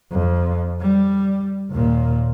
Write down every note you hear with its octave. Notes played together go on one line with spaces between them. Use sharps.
F2
G3
D#2 A#2